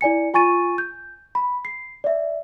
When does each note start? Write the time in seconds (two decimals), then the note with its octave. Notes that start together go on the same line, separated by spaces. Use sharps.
0.01 E4 D5 G#5 C#7
0.34 F4 G#5 C#6 A6 D#7
0.78 G6
1.35 B5
1.65 C7
2.04 D5 E5